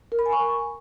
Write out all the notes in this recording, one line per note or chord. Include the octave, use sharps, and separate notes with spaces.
A#4
B5
G#5
C#6